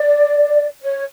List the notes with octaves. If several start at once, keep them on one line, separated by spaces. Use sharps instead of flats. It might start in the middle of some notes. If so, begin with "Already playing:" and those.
Already playing: D5
C#5